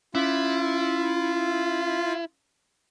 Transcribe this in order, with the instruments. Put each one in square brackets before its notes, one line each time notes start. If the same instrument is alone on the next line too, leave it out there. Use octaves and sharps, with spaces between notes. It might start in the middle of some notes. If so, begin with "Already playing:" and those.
[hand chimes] C#4 [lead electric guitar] E4 [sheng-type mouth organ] F4